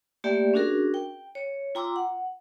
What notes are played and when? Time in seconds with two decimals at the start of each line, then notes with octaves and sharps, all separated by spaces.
0.24 A3 A#3 G4 D5 E5 G5
0.54 C#4 D4 F#4 G#4 A#4
0.94 G5
1.35 C#5
1.75 F4 G5 A#5 C6 D6 E6
1.96 F#5